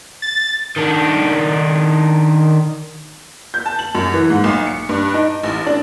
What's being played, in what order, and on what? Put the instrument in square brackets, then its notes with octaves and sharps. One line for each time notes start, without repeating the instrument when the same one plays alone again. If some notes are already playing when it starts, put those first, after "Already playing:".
[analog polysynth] A6
[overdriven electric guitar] D#3 D4
[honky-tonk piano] G6
A5
F#7
F#2
E3
G#2
B1
C#7
G2
D#4
A1
D4